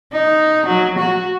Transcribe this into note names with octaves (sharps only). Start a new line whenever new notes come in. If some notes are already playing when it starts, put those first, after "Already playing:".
D#4
F#3
F#4